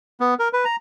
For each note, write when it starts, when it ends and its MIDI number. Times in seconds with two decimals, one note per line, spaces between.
0.20 0.34 59
0.39 0.48 70
0.53 0.65 71
0.65 0.76 82